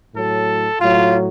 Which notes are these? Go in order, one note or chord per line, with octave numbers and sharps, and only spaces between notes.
A2 F#3 A4
A2 F#3 F4